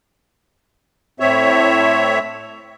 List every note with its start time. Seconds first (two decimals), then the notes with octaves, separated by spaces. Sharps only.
1.20 A2 C4 C#5 E5